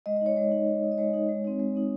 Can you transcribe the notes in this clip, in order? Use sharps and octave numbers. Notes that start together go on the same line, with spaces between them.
G#3 D#5
D#5
D#4 C#5
G#3 C#5
D#4
G#3
D#4
D#5
G#3 C#5
D#4
G#3
C4 D#4
G#3
C4 D#4